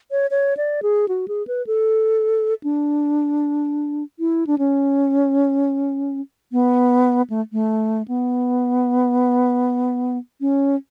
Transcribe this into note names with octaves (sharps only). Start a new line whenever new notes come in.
C#5
C#5
D5
G#4
F#4
G#4
B4
A4
D4
E4
D4
C#4
B3
A3
A3
B3
C#4